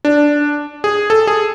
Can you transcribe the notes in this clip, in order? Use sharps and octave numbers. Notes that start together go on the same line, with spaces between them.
D4
G#4
A4
G#4